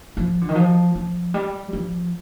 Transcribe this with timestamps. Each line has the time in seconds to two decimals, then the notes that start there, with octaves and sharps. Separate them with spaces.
0.17 F3
0.41 D3
0.49 D#3
0.55 F3
0.95 F3
1.34 G3
1.73 F3